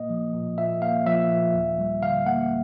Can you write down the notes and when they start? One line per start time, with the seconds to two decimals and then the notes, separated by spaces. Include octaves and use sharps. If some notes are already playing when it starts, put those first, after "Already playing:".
Already playing: A#2 A#3 D#5
0.09 F3
0.33 A#2
0.58 A#2 E5
0.82 A#3 F5
1.06 F3 E5
1.30 A#2
1.54 D#2
1.78 G3
2.02 D3 F5
2.26 A#3 F#5